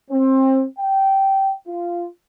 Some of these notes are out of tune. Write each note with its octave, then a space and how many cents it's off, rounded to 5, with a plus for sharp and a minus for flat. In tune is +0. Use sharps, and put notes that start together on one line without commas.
C4 +25
G5 -15
F4 -10